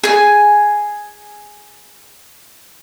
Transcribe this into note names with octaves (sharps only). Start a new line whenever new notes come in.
G#4 G#5